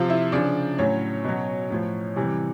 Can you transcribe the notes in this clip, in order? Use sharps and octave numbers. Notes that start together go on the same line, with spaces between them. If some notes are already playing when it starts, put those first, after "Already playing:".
Already playing: C3 F3 F4 F5
E4 E5
C#3 F3 D4 D5
A2 F#3 C#4 C#5
B2 F#3
A2 F3
C3 E3 G3